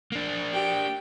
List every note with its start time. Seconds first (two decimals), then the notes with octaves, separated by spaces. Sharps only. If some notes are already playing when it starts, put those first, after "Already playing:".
0.12 A#3 D4
0.51 G4 G5